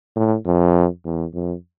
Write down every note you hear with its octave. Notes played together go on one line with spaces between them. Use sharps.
A2
F2
E2
F2